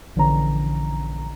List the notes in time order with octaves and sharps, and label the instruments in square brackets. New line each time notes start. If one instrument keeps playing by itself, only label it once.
[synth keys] A#1 D3 E3 C#4 A#5